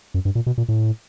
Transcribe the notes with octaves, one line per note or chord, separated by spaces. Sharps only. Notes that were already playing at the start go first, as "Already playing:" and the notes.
F#2
G2
A#2
B2
A#2
A2